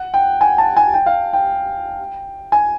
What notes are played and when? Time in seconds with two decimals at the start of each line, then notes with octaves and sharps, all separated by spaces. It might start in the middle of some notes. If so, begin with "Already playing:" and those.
Already playing: F#5
0.14 G5
0.41 G#5
0.58 A5
0.77 G#5
0.94 G5
1.06 F5
1.33 G5
2.52 G#5